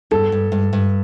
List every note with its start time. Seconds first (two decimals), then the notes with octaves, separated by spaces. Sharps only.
0.11 G2 A4
0.32 G2
0.52 G2
0.73 G2